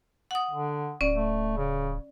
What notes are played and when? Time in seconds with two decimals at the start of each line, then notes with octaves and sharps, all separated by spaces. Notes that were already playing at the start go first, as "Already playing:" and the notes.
0.31 F#5 D#6
0.51 D3
1.01 D1 C#4 D5
1.14 A3
1.57 C#3